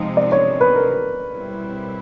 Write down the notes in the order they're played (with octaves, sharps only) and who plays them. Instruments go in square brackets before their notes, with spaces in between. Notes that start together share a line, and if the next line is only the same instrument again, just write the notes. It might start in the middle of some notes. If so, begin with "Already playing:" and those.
Already playing: [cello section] C3 F3 G#3 C4 D#4
[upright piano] D5
C#5
B4
A#4
[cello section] B2 G3 C4 E4